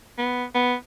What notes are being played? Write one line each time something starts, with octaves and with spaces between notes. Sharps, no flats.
B3
B3